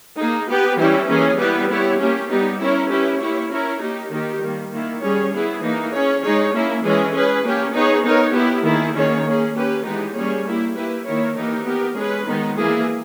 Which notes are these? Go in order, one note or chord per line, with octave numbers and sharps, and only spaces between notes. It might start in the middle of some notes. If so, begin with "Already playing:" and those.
A#3 D#4 G#4
B3 G4 B4
E3 G3 C#4 E4 G4
E3 A#3 C#4 G#4
G3 B3 E4 G4 B4
B3 E4 G4 C#5
A#3 C#4 G4
G3 B3 D#4 G4
C#4 E4 A#4 C#5
C#4 E4 G4 B4
A#3 E4 G4 C#5
C#4 E4 A#4 C#5
A#3 D#4 G4
D#3 A#3 D#4 G4 A#4
D#3 G3 A#3
D#3 A#3 E4
G3 C#4 G#4 C#5
B3 E4 G#4
E3 A#3 D#4
C#4 G#4 C#5
G#3 D#4 G#4 C#5
A#3 C#4 E4
E3 G#3 C#4 G#4
C#4 G#4 B4
A#3 C#4 G4
B3 D#4 G#4 C#5
B3 D#4 A#4 C#5
B3 E4 G4
D#3 A#3 E4 G#4
D#3 A#3 C#4 G#4 C#5
A#3 C#4 G#4
A#3 C#4 G4 B4
E3 G#3 B3 D#4 G4
G3 A#3 C#4 G#4 C#5
A#3 E4 G4
A#3 E4 G4 B4
D#3 A#3 E4 A#4 C#5
E3 A#3 D#4 G4 A#4
B3 G4 A#4
G#3 C#4 G#4 B4
D#3 G#3 B3 D#4
E3 A#3 E4 G#4